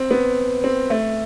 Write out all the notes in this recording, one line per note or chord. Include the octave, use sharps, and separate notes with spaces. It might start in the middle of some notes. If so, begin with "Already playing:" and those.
Already playing: C4
B3
C4
A3